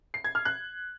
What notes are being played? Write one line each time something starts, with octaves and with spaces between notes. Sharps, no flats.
C7
G#6
F6
F#6